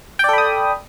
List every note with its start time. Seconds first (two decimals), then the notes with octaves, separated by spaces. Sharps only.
0.19 G5
0.24 D5
0.29 A4
0.33 B5
0.38 D#6